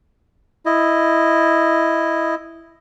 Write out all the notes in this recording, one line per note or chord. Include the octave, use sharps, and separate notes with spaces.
E4 D#5